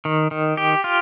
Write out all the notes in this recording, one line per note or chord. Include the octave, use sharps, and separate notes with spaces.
D#3
D#3
G4
F4